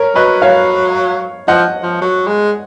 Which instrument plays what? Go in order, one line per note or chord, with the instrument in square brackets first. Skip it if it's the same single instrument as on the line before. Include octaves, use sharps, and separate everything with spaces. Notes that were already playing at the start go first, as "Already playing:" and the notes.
Already playing: [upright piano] A#4 C#5
[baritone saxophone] F#3 [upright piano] B4 D#5
[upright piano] C#5 F5
[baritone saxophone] F3 [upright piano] D#5 F#5
[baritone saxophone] F3
F#3
G#3